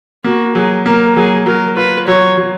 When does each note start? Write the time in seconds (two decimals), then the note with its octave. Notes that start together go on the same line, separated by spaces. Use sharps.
0.24 A#3 F#4
0.55 F#3 G#4
0.85 A#3 A#4
1.16 F#3 G#4
1.46 F#3 A#4
1.77 F4 B4
2.07 F#3 C#5
2.37 F#3